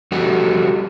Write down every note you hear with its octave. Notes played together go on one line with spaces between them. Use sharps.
G3 F#4 G4 A4 D#5 F#5